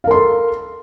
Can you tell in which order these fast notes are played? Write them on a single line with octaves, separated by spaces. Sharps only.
F5 A#4 C6 A4